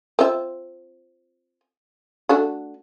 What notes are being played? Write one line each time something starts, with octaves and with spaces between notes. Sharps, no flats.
C4 F4 E5
A3 D4 F#4